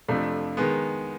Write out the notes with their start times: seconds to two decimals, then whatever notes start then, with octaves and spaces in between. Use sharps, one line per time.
0.08 F2 C3 F3 A3 D4
0.57 D#3 G#3 B3